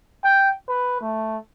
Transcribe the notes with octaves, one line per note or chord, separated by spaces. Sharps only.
G5
B4
A3